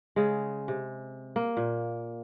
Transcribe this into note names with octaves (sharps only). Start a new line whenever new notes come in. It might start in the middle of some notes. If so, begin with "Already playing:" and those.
C#3 G#3
C3
A#3
A#2